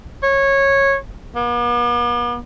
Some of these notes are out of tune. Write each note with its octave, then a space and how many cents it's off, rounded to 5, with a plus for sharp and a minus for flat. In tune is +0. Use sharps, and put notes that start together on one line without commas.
C#5 -15
B3 -45